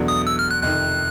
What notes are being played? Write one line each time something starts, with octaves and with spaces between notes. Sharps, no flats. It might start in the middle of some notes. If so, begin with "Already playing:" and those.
Already playing: E2 B2 F#3 A3 D4
D#6
E6
F6
F#6
F2 C3 D#3 F#6